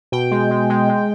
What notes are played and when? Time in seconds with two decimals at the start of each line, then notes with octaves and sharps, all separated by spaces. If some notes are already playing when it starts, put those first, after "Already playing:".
0.12 B2 G5
0.31 G#3
0.51 G#3
0.70 G#3
0.89 G#3